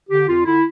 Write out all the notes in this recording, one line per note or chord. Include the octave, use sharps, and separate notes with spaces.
D3 G4
F2 F4
D3 E4